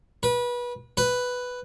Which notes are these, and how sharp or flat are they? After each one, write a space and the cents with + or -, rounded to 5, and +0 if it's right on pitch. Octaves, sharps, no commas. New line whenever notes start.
B4 -25
B4 +5